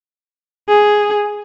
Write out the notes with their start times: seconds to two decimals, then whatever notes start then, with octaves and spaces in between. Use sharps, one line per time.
0.68 G#4